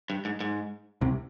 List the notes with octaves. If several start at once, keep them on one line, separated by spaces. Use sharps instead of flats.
G2
G#2
G#2
C2 C3